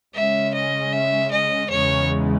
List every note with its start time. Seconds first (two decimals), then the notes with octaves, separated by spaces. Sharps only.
0.14 C#3 G#3 C#4 E5
0.54 D#5
0.93 E5
1.32 D#5
1.71 E2 C#3 G#3 C#5